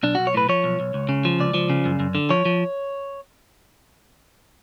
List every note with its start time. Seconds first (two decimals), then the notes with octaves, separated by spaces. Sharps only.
0.03 B1 D4
0.15 B1 F#4
0.27 C#5
0.34 A2 B4
0.49 F3 C#5
0.64 B1
0.80 B1
0.94 C#2
1.09 C#3
1.25 F3
1.40 C#2 D5
1.54 F3
1.70 C#3
1.85 F#2
2.00 F#2
2.15 D3
2.30 F3 C#5
2.45 F3